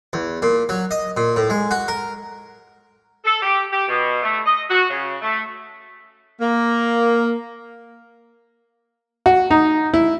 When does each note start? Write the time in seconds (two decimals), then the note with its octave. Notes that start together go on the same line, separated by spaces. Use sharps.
0.13 E2
0.42 A#2
0.69 F#3
0.91 D#5
1.17 A#2
1.36 A2
1.50 G#3
1.71 F#4
1.88 A#4
3.25 A4
3.42 G4
3.71 G4
3.88 B2
4.23 A3
4.45 D#5
4.70 F#4
4.91 C#3
5.22 A3
6.41 A#3
9.26 F#4
9.51 D#4
9.94 E4